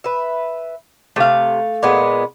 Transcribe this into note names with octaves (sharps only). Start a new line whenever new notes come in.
B4 E5
C3 A3 F5
A#2 G#3 B3